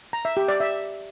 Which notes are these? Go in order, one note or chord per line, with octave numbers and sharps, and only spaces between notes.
A#5
E5
G4
D5
E5